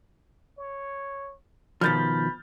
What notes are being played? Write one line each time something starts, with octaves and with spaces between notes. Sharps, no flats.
C#5
B2 D#3 F3 B5 F6 G6 A6